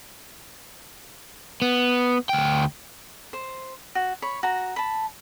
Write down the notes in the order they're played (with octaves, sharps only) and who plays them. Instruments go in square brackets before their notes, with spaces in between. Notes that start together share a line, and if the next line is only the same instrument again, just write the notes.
[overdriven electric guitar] B3
D2 G5
[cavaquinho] C5
F#4
C#5 B5
F#4 A#5
A5 B5